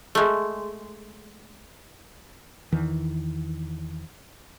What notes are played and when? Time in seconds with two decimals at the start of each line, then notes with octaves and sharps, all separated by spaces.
0.15 G#3 A3
2.72 E2 D#3 E3